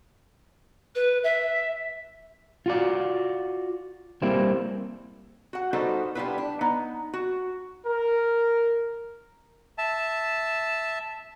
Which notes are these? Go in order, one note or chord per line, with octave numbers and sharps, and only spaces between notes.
B4
E5
F4 F#4 D5
G3 A#3 C4 E4
F#4 F#5
G3 B3 D#4 F#4 A4 C5
G3 B3 D4 E4 F4 B4
D4
B3 D#4
F#4
A#4
E5 A5